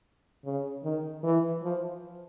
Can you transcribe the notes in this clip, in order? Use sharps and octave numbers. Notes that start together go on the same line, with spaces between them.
C#3
D#3
E3
F3